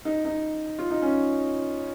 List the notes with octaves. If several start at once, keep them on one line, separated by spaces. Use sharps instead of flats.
D#4
D#4
F4
D#4
C#4